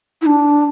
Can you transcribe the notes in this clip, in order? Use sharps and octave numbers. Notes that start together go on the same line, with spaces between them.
E4
D4